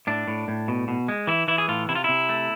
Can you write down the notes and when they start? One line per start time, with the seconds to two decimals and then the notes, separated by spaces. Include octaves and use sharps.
0.07 A2 D4
0.27 A2
0.48 A2
0.68 B2
0.88 B2
1.08 G#3
1.27 E3 E4
1.48 E3 E4
1.58 G#4
1.68 A2 F4
1.89 C3 E4
1.95 F4
2.04 C3 E4
2.29 A3